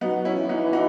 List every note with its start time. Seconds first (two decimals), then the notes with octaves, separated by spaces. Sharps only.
0.01 F#3 B3 D#4
0.25 C#4 E4
0.37 E3
0.49 B3 D#4
0.73 D#4 F#4